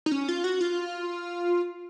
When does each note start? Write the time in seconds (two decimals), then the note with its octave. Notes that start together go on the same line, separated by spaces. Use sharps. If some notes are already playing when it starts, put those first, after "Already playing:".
0.06 D#4
0.12 C#4
0.28 F4
0.44 F#4
0.61 F4